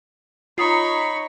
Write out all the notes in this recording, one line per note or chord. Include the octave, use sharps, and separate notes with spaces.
D#4 F4 C#5 A#5 B5 C#6 D#6 C7